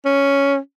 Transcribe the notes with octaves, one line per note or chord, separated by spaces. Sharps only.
C#4